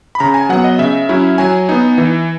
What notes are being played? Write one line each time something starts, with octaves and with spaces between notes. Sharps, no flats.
B5
C#3 A#5
G#5
F#3 B3 F#5
D#5
C#3 E5
F#3 C#4 E4
F#3 G#5
B3 D#4
E3